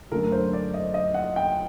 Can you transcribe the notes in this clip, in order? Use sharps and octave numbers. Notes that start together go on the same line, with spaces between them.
F#2 D3 A3 A#4
C5
D5
D#5
D#5
F#5
G5